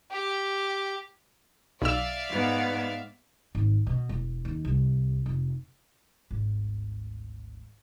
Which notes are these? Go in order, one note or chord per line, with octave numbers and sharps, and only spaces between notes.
G4
B1 D5 E5 F5 E6
G#2 B3
G#1
B2
E1
D#2
C2
F1
G#1 D2